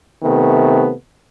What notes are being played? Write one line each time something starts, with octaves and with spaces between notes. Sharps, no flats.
C3 D#3 A3 B3